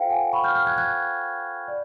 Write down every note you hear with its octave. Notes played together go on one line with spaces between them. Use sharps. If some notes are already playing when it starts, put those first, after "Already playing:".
Already playing: F4 A4 C5 F5 G5
F#5 G#5
B5 C#6
F6 G6
F6 G6
F#6 G#6
F#6 G#6
D5